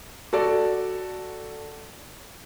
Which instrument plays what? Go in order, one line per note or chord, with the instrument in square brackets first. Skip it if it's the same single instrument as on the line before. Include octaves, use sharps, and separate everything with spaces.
[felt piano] F#4 A4 D5